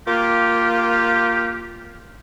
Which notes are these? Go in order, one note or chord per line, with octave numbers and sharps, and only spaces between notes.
A#3 F4 G4